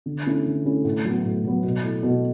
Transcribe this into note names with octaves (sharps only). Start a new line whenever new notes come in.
D3
A3 C#4 E4
D3
A3 C#4 E4
A2
F#3 B3
A2
F#3 B3
B2
A3 E4
B2